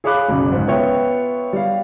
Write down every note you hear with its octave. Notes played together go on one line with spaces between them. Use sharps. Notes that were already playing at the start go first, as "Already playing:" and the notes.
G#4 C#5 F5 B5 D6 F#6
F#1 B1 C#3
C#2 G#2 C5
B3 F4 C#5 E5 G5
G3 F5